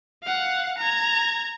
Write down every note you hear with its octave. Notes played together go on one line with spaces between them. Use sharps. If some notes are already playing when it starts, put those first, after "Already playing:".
F5 F#5
A#5 G#6